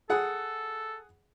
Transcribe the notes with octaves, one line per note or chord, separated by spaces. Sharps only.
G#4 A4 F#5